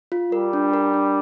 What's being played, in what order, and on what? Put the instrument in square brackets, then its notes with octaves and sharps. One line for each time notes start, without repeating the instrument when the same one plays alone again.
[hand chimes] F4
[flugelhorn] G3 [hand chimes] A#4
[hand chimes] D4
A#4
D4